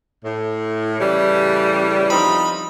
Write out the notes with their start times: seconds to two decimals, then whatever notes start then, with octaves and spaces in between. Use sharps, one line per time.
0.23 A2
0.99 A2 C#3 E3 G3
2.10 F3 G3 C4 D#4 B5